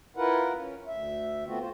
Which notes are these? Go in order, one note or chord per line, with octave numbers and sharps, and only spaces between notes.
E4 F4 A#4 B4 F#5
C#4
D2 E5
A3 B3 C4 F4 F#4
F4 C5